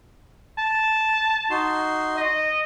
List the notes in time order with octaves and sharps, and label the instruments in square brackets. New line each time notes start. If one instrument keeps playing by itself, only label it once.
[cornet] A5
[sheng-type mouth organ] D#4 F#4 C6
[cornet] D#5